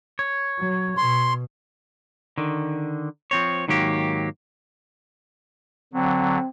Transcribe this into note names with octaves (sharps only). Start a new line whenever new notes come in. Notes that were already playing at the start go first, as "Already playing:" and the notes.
C#5
F#3
B2 C6
D3 D#3
F3 C4 C#5
G#2 D#3 F#3 A#3 G4
D3 F#3 C4